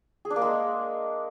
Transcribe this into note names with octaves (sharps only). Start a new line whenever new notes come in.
G#4
D4
A#3
G#3